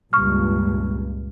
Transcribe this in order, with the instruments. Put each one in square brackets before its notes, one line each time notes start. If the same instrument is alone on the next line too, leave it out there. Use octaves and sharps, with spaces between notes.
[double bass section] C#2 G2 A#2 [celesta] C#6 F6